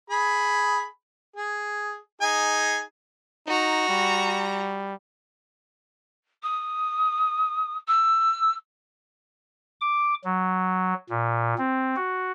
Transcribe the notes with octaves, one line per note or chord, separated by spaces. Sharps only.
G#4 B5
G#4
D#4 G#4 G#5
D#4 F#4 A#5
G3
D#6
E6
D6
F#3
A#2
C4
F#4